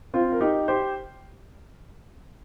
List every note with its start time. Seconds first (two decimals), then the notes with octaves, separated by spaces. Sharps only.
0.14 C4 F4
0.32 A#4
0.41 D#4 G4
0.68 G4 C5